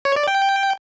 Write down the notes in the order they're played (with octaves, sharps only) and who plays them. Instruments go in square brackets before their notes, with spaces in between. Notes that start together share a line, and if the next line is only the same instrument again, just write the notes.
[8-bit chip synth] C#5
D5
G5